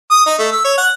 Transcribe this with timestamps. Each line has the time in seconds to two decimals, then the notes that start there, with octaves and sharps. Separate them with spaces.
0.11 D#6
0.26 D#4
0.39 A3
0.52 E6
0.65 C#5
0.78 F#5